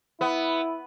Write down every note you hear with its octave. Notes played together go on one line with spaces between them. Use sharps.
B3 E4